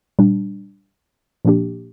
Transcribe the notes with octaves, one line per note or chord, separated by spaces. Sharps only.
A#2 G3 D4
A#2 F3 A#3 D4 G4